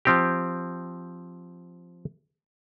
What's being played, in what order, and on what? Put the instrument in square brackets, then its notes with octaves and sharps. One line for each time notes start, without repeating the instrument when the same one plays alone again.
[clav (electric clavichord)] F3 C4 G4